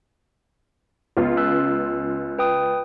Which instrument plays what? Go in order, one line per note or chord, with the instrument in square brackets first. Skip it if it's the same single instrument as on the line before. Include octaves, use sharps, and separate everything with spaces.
[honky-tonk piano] C#2 B3 F4
[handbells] C#4 E6 F#6
B4 G5 D#6